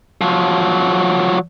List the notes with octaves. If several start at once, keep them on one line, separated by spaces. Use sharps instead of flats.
F3 F#3